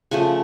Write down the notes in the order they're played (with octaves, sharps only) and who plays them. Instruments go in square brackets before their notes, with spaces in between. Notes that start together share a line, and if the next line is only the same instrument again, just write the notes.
[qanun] C#3 F3 A3 F#5 G#5